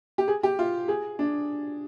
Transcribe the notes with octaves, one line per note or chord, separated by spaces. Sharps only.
G4
G#4
G4
F4
G#4
D4